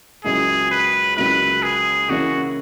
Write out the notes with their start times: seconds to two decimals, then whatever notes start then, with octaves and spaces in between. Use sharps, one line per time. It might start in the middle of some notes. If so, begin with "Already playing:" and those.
0.24 C#2 C#3 F#3 A#3 E4 G#4
0.71 B4
1.17 C#2 C#3 F#3 A#3 E4 B4
1.62 G#4
2.09 C#3 E3 A#3 C#4 E4 F#4